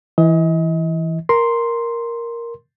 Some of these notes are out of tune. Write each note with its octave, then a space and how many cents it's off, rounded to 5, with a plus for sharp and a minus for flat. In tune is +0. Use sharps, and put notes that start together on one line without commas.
E3 +0 D#5 +35
A#4 +0 C6 +0